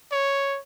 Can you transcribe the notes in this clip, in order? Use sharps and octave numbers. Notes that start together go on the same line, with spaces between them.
C#5